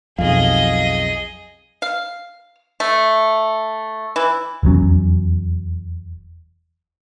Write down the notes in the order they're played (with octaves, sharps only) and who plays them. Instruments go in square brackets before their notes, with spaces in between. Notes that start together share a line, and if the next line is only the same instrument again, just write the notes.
[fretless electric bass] B1 F2 [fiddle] G#4 D#5 [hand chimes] F5
[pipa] F5
A3
E3
[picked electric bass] F1 E2 F#3 C#4